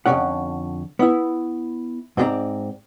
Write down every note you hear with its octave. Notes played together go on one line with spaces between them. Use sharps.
F2 D3 D#3 A3 C#4 F#5
B3 E4
G#2 C4 D#4 G#4 D5 A#5